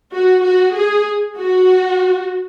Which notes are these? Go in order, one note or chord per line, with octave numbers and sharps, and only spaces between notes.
F#4
F#4
G#4
F#4